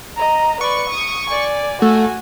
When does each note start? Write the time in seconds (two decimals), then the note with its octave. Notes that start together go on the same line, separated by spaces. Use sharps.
0.16 D#5 A#5
0.61 B4 D5 C#6
0.90 D#6
1.30 D5 G#5
1.82 A3 F#4 G#5